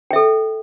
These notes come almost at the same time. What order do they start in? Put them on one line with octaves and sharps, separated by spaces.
G5 E5 A4